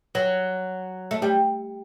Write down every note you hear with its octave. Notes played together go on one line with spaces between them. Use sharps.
F#3
A3
G3